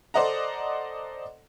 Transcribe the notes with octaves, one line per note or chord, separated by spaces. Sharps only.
A4 C5 D5 D#5 F#5 A#5